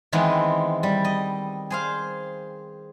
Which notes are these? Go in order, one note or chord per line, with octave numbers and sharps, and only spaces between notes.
D#3 E3 G#3 B3 C4
G3
D#5
G#4 C5 F5